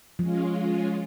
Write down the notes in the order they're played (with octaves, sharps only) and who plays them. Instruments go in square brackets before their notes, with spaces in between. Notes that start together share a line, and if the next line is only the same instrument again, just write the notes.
[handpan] F3 [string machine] G#3 C#4 F4